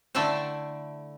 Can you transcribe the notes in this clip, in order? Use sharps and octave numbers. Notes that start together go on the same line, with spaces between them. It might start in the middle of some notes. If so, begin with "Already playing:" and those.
D3 A3 E4 E5 G5 A5